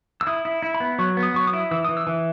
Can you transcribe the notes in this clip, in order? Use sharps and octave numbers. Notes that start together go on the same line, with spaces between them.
E6
E4 D#6
E4
E4
B5
B3
F#3 C#6
B3
D#6
F#3 C#6
D#6
E4
E3 E6
E3 D#6
E6
E3